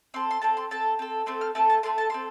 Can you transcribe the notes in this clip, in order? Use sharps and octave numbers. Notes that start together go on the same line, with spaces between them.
C4 A4 C6
C6
C4 A4 A5
C6
C4 A4 A5
C4 A4
A3 C4 A4 C6
F6
A3 C4 A4 A5
A5
A3 C4 A4 C6
A5
C4 A4 C6